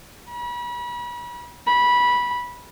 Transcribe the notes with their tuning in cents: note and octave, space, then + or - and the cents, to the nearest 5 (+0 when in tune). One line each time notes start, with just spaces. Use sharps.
B5 -35
B5 -15